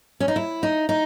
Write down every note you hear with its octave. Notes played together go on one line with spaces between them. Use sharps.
C#4
D#4
E4
D#4
D#4